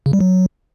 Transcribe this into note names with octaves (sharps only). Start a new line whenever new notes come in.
C#3
G3
F#3